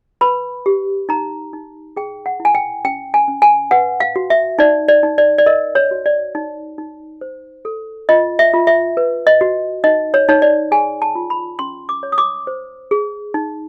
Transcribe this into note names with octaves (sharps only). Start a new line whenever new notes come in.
B4 B5
G4
D#4 A#5
D#4
G#4 G5
F#5
E4
G#5
G5
C#4 G5
G#5
C#4
G#5
B4 F#5
F5
F#4
E5
D#4 D5
D5
D#4
D5
D5
A#4 D#5
C#5
F#4
D5
D#4
D#4
C5
A4
F4 D#5
E5
F4
E5
B4
D#5
F#4
D#4 D#5
C#5
D#4 C#5
D5
G#4 G#5
A5
F4
B5
C#4 C6
D6
C#5
D#6
D6
C5
G#4
D#4